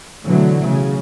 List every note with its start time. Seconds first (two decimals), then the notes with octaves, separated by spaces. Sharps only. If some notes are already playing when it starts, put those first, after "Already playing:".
0.25 B2 D3 E3 F#3 A3
0.65 C#3